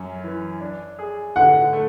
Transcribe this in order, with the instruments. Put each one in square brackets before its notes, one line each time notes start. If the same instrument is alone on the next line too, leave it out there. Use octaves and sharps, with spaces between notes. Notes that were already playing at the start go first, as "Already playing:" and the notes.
Already playing: [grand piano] F#2 C#4
E3
D4
G#4
[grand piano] D3 [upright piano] F#5
[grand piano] A3